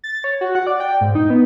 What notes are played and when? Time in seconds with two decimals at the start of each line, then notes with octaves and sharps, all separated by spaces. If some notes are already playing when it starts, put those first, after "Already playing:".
0.04 A6
0.24 C#5
0.41 F#4
0.55 F#5
0.67 D5
0.80 G5
1.01 G#2
1.15 D#4
1.30 B3